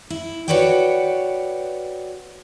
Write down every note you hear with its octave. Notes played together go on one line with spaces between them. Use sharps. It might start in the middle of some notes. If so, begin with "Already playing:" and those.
E4
F#4 A4 B4 C#5 D5 G5